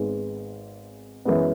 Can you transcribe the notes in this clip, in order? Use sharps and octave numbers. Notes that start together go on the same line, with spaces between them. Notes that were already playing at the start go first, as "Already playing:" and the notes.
Already playing: G#1 G#2 G#3 B3
F#2 E3 G#3 B3